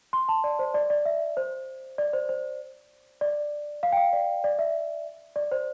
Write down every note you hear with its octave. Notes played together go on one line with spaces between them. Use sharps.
C6
A5
D5
C5
D5
D5
E5
C5
D5
C5
C5
D5
F5
G5
F5
D5
D5
E5
D5
C5